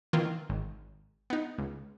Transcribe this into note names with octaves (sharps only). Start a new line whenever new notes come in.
D#3 E3 A#3 C4 F4
G#1
B3 D#4
C#2